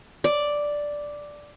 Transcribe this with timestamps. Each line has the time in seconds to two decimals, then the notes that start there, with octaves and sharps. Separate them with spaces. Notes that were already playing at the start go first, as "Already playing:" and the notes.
0.24 D5